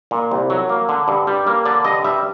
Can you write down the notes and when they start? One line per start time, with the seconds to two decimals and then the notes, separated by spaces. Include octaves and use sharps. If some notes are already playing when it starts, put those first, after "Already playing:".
0.11 A#2
0.31 C2
0.50 F#3
0.69 A#3
0.89 D3
1.08 G2
1.27 G3
1.47 A#3
1.65 D3 D5
1.85 G2 D#5
2.04 G3 E5